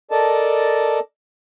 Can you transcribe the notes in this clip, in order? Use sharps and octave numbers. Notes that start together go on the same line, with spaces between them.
A4 A#4 D5 D#5 A5